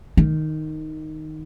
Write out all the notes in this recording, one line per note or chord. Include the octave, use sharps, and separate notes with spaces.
D#3